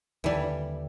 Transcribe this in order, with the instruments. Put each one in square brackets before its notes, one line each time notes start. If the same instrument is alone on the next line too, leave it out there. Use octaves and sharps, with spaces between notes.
[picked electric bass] D#2 D3 [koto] E3 G3